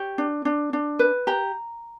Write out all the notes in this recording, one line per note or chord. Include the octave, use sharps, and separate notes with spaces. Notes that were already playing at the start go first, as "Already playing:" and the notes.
Already playing: G4 C#5
D4
D4
D4
B4
G4 A#5